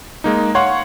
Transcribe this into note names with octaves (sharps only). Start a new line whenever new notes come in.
G#3 A#3 D#4
C#5 F5 F#5 C6 C#6